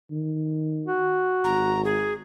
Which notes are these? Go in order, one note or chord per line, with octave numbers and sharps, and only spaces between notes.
D#3
F#4
G#1 A#5
G#4